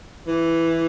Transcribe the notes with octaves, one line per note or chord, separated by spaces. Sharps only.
E3